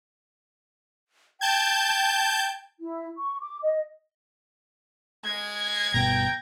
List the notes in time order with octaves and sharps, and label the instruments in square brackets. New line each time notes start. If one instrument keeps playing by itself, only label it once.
[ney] G5 [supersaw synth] A5 G6 G#6
[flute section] E4
C#6
D6
D#5
[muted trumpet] G#3 [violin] G#6
[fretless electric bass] G1 B2 B3 [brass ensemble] G5 [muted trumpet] A#5